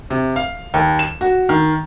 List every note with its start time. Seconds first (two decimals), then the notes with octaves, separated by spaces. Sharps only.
0.10 C3
0.36 F5
0.74 D#2
0.99 E7
1.21 F#4
1.49 D#3